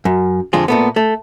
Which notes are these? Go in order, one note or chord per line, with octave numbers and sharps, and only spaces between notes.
F#2
F2 D3 G#3 F4 G#4
A#2 A3 B3
A3